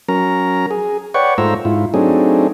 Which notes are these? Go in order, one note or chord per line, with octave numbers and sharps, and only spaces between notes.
F#3 C#4 A#4 A#5
G#4
B4 C#5 D5 F#5 G5 C#6
G#2 A3 F4 C5 A#5 E6
G#2 E4 F4
F#3 A3 C4 D4 D#4 G#4